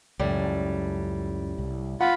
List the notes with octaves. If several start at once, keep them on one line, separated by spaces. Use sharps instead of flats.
C#2 F#2 A2 G3
C2
F4 F#5 B5